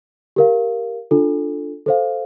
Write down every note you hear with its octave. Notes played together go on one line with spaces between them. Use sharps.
G4 A#4 F5
D4 F4 A4
A4 C5 F5